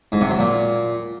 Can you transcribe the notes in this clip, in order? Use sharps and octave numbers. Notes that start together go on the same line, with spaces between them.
G#2
C3
F#3
A#2